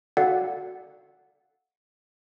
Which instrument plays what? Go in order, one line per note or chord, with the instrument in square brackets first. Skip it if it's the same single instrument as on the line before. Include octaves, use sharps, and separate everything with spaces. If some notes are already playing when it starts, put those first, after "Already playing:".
[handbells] F#4 A4 D5 F5 F#5